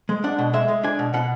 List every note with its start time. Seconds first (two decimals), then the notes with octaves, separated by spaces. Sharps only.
0.09 G#3
0.24 D4 F#5
0.39 B2
0.53 G#3 E5
0.68 G#3
0.83 D4 G#5
0.99 B2
1.14 B2 F#5